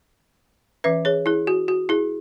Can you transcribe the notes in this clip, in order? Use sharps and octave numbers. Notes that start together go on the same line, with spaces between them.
E3 C#4 B4 E5
G#4 C#5
E4 G#4
F#4
F#4
E4 G#4